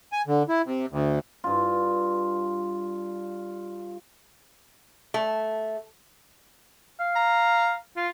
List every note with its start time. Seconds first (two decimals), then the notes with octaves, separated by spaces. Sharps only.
0.13 G#5
0.27 D3
0.49 E4
0.65 C3
0.91 D2
1.44 G2 F4
5.14 A3
7.00 F5
7.16 A#5
7.97 F4